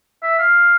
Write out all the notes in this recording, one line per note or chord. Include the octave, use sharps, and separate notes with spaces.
E5
F5